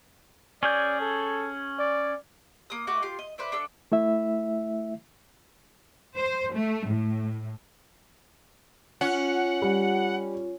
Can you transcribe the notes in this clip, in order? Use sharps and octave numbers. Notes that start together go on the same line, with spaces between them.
C#4 G#4 D5 G6
A4
D5
A#3 D#6
A3 F#4 D#5 D6
F4 G4 C6
D#5
B4 C5 D5 E5
D4 A4 F#5 E6
A3 E4 E5
C5
A3
A2
C#4 F4 F#5
G3